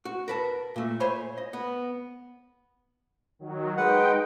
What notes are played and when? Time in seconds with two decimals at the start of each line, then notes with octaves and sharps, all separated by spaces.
0.05 F#4
0.28 A#4 B4 A5
0.76 A#2 A3
1.00 C5 C#5 G#5 B5
1.38 D#5
1.53 B3
3.39 D#3 F#3
3.77 G#3 D#4 B4 F#5 G5